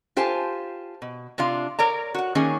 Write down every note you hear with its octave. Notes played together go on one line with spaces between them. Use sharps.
F4 G4 C5 G#5 A5
B2
C3 D4 F4 F5
A#4 C#5 D5 A#5
F#4 F#5
D#3 A#3 C#4 G#4